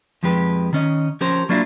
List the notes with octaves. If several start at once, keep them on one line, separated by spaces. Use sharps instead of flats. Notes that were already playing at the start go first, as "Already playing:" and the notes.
F2 F3 G#3 G4 B4
D#3 C#4 D#5
F3 C#4 G4 A#4 C5
F#3 A#3 D4 E4 F4